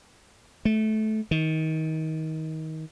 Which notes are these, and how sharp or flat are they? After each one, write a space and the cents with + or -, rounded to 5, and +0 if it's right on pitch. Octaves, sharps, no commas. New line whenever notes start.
A3 -20
D#3 +25